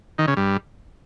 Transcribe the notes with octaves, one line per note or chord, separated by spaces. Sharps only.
D#3
C#3
G2